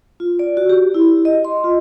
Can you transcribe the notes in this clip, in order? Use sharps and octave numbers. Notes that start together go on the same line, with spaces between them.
F4
D5
F#4
G4
E4
D#5
C6
F4